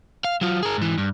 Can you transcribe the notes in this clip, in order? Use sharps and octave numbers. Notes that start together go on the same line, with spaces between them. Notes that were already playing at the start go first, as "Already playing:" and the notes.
F5
F#3 F4
G#4 A#4
G#2 E3
G2